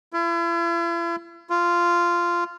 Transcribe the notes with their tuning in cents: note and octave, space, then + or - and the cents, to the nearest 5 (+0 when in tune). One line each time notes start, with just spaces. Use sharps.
E4 +45
F4 -10